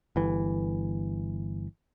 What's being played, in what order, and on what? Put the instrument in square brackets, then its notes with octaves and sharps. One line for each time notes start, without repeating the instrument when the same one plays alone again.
[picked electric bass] G1 E3